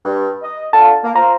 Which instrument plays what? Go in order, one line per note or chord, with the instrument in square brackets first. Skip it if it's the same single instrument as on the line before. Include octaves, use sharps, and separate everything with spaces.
[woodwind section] G2
D#5
[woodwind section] D3 F4 [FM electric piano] A5
[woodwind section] A#3
[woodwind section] F4 C5 [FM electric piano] A#5